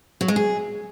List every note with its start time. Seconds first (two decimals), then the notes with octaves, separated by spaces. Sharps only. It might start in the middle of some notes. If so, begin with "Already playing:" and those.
0.21 F#3
0.28 G#3
0.36 G#4